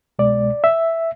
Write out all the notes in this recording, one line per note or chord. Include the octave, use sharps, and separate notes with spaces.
C2 B2 G#3 D5
E5